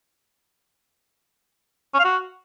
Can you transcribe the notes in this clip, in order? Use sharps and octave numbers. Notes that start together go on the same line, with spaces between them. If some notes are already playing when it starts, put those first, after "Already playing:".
C#4
F5
F#4